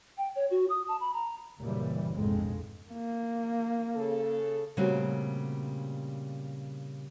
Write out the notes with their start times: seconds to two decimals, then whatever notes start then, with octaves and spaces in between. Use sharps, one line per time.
0.18 G5
0.36 C#5
0.51 F#4
0.70 D#6
0.88 A5
1.00 B5
1.14 A#5
1.60 F#1 A#2 E3 G3
2.12 A#1 F2 G#2 B2 G#3 C4
2.92 A#3
3.95 C#3 A4
4.77 A#2 C#3 G3 A3 C4 F#4